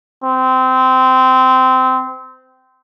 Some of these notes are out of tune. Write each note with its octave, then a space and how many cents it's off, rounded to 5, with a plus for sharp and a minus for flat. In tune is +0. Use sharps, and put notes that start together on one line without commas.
C4 -20